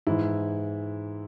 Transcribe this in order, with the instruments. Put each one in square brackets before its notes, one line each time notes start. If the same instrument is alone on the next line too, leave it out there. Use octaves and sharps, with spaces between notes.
[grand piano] G#2 E3 E4